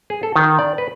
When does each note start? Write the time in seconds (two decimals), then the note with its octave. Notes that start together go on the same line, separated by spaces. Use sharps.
0.10 G#4
0.23 A4
0.36 D#3
0.59 D5
0.78 B4